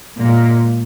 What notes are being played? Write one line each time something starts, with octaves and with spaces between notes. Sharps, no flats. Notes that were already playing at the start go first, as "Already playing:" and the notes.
A#2 G#3 A#3